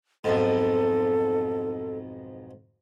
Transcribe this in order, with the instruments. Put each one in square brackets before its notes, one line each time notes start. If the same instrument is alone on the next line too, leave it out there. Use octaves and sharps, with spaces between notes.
[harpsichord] B1 F2 G#2 [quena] A4